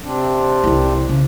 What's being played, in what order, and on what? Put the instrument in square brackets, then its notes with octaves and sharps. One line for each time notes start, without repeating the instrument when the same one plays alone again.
[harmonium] C3 C4 D4
[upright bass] C2 E4
C#3